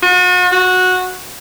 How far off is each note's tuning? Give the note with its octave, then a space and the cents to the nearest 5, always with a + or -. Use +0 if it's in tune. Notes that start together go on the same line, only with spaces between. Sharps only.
F#4 -40
F#4 -15